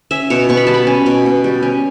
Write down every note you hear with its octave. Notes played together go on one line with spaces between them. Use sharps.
C#4 E5
B2 C#5
B2 C#6
B5
G3 A5
B5
C#4
B2
B2
G3
C#4